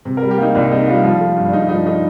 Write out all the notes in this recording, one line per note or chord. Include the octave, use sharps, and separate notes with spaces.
C3
A#4
G3
G4
A#3 D#4
C2 D4
C3 D#4
G3 F4
F3 F4
A3
G2
D4
G2 D#4
F3 D#4
A3 D#4